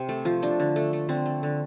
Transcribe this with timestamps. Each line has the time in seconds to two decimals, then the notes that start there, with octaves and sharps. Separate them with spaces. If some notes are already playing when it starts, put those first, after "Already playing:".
Already playing: C3 C4
0.09 A3
0.25 F3
0.42 A3 D4
0.60 D3
0.76 A3
0.93 A3
1.09 D3 C4
1.26 A3
1.43 D3